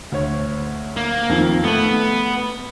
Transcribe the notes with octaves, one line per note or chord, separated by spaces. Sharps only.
D2 C#5
A#3
F2 D#3
A3 B3 F#7